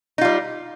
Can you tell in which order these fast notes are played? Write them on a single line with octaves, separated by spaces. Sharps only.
D#4 F4 G3